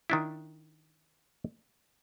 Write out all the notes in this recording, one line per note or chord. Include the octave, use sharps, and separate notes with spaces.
D#3 D4 E4